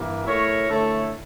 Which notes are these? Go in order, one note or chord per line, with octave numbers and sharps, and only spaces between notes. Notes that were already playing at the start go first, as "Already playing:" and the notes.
Already playing: G2 E3 A#3
A3 E4 A#4 C#5
D3 A3 E4 A4 C#5